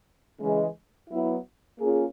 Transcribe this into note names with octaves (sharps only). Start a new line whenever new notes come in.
C#3 E3 G#3
F#3 B3 E4
A#3 C#4 F4 G#4